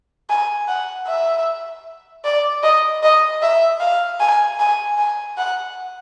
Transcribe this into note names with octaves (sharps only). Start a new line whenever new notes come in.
G#5
F#5
E5
D5
D#5
D#5
E5
F5
G#5
G#5
G#5
F#5